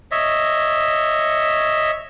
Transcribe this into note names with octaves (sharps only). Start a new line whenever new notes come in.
C#5 D#5 E5